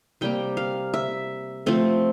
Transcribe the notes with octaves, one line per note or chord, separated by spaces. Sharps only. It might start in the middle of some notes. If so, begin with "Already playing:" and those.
C3 G3 A#3 G5
F5
E5
F3 A3 C4